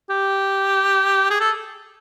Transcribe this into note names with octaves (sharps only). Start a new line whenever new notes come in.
G4
G#4
A4